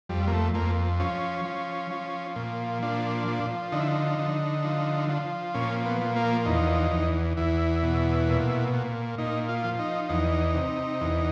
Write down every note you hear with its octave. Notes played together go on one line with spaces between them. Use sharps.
F2 G3
A#3
A3
F2 A#3
F3 C#4
F3
F3
A#2
F3 D4
F3
D3 D#4
E4
D#4
D3
F3
F3
A#2 C#4
B3
F3
A#3
E2 D#4
E2
E2 E4
B2
A#2
A#2
A#2 D#4
F4
F3
D#4
E2 D#4
C3
E2